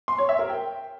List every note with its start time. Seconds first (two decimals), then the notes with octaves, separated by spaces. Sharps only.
0.08 C6
0.18 C#5
0.29 E5
0.39 A#4
0.50 G5